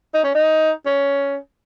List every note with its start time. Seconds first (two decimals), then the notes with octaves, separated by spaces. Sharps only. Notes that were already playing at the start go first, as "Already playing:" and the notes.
0.14 D#4
0.24 C#4
0.34 D#4
0.86 C#4